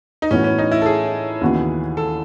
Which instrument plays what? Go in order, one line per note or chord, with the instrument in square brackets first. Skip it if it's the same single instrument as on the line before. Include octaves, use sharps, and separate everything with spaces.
[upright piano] D#4
[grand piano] A2 E3 B3 F#4 [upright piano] C#4
[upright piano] C#4
D#4
E4
A4
G#4
[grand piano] D#2 C#3 E3 B3 F#4
[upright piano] A4